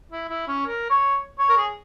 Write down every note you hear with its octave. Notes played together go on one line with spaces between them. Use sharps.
E4
E4
C#4
A#4
C#5
C#5
A#4
G#4